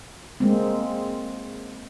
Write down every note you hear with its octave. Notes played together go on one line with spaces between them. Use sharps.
G#3 A#3 C4